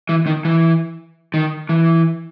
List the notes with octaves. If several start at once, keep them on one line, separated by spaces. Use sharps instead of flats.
E3
D#3
E3
D#3
E3